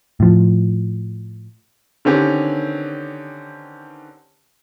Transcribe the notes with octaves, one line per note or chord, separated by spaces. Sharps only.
A2 F3
D3 D#3 C4 C#4 G4 B4